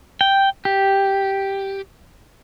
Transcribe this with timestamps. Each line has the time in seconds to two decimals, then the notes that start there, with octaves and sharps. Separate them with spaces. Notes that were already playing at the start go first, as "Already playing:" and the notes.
0.21 G5
0.65 G4